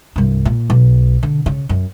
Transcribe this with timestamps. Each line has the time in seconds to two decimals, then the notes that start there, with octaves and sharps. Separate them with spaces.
0.16 C2 G2
0.45 A#2
0.70 B1
1.23 D3
1.46 C#3
1.69 F#2